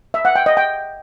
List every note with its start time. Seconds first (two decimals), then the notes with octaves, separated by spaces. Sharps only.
0.14 E5
0.25 F#5
0.36 G5
0.46 D#5
0.57 G5